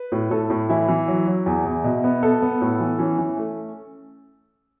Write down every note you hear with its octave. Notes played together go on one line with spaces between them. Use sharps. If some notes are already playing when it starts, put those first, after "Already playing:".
Already playing: B4
A2
A2 A4
A2
E3 E4
E3
F#3
F#3
E2
E2
B2
B3
B3 A4
B3
A2
E3
E3 C#4
E3
A3